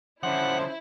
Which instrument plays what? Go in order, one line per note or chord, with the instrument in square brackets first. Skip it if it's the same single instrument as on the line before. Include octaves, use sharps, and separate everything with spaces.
[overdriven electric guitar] D3 F3 [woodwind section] C#4 C5 [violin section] E4 [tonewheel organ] F#5